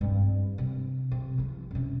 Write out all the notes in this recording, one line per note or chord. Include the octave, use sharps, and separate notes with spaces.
G2 C4
C3
C3
E3 F3
F#2 C3